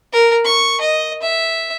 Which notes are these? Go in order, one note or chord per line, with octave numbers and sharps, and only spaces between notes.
A#4
C#6
D#5
E5